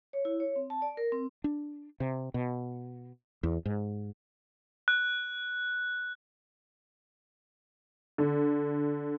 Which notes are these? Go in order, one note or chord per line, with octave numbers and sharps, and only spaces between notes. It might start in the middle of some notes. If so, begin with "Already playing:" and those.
C#5
E4
C#5
C4
A5
D5
A#4
C4
D4
C3
B2
E2
G#2
F#6
D3